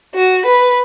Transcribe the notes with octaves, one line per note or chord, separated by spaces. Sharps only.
F#4
B4